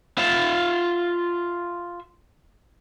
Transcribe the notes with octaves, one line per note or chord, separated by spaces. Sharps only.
F4 E5